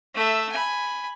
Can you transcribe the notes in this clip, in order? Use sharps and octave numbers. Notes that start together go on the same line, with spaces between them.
A3 E5
G#5 B5